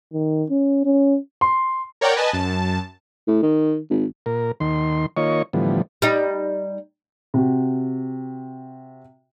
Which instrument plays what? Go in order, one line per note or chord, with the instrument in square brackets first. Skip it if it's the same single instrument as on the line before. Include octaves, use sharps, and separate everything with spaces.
[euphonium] D#3
C#4
C#4
[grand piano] C6
[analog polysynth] A#4 C#5 D5 F#5 G5 A#5
B4 D#5 G#5 A5
F#2 A5
[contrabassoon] A2
D#3
G#1
[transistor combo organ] A#2 A#4
D#2 D#3 C6
D#3 A#3 F4 C#5 D#5 C#6
A2 D3 E3 F3 G3 B3
[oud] G3 D#4
[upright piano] C3 F#4